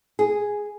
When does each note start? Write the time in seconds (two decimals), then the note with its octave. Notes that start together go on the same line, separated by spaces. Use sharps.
0.19 G#4